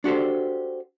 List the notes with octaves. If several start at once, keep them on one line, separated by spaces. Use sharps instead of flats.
D4 F#4 G4 A4 C5